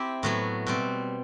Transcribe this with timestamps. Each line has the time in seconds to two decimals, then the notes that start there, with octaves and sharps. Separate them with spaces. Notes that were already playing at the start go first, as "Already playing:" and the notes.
Already playing: C4 E4 G4
0.23 A2 F#3 B3
0.67 B2 G3 C4